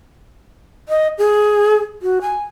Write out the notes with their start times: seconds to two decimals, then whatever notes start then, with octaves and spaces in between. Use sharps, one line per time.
0.89 D#5
1.18 G#4
2.02 F#4
2.21 G#5